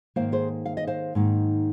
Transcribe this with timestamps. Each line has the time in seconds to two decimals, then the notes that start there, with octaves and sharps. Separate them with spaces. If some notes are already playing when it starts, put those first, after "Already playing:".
0.16 G#2 D#3 A#3 C5 F5
0.32 G#4 C5
0.66 F5
0.77 D#5
0.87 C5 F5
1.15 G#2 D#3 A#3 D#4